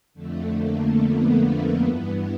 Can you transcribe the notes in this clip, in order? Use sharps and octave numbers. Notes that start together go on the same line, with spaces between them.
F2 D3 A3
A#3
B3
A#3
G2 E3 B3